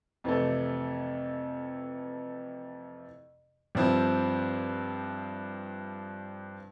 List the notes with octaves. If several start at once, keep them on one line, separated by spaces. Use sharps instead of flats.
F2 C3 E3 A3
G2 F3 C4 E4